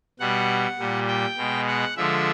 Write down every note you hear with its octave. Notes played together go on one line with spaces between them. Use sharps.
B2 G3 F#5
A#2 G3
G5
B2 G#3
F#5
D3 F3 G#3 E5